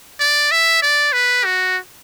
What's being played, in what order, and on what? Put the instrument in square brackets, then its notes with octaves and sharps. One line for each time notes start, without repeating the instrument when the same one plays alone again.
[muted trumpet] D5
E5
D5
B4
F#4